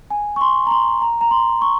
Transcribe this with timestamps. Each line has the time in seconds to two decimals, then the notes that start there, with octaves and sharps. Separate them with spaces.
0.10 G#5
0.36 C#6
0.41 C6
0.67 A#5
0.71 C6
1.02 A#5
1.21 A#5
1.31 C6
1.62 C#6